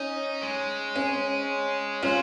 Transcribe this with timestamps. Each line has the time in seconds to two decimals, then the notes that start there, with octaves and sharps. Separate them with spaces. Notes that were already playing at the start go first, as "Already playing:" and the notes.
Already playing: C#4 D#4
0.43 G#3
0.96 C#4
2.03 F#3 C#4 F4